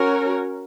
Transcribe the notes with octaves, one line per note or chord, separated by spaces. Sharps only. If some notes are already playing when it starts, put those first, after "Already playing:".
Already playing: C#4 F#4 A#4 C#5